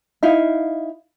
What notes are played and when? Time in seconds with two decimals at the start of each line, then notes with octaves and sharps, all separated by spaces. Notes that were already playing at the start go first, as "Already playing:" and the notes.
0.23 D#4 E4 F5